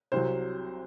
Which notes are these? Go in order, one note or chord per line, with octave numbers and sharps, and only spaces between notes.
C2 C3 F#3 C5